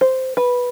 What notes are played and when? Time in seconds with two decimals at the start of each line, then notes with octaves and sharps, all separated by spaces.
0.01 C5
0.37 B4